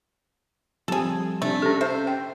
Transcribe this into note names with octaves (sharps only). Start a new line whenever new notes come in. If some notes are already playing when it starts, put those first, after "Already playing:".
F3 G3 C4 G#4 A4
C3 A3 D4
C#4 G4 A4
C5 E5
G5